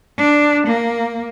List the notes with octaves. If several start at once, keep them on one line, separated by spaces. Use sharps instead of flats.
D4
A#3